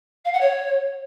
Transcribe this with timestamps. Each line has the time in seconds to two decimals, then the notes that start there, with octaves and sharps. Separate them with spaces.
0.25 F5
0.32 F#5
0.40 C#5